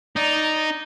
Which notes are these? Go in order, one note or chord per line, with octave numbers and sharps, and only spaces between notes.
D#4 D5 A#5